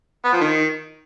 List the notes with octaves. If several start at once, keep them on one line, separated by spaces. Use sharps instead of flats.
B3
F3
D#3